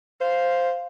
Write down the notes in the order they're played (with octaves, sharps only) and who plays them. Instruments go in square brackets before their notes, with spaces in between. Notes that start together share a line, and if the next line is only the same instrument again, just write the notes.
[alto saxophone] C5 [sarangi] F5